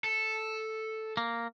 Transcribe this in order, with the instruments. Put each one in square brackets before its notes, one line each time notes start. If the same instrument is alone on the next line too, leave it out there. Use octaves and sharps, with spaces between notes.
[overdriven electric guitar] A4
[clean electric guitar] A#3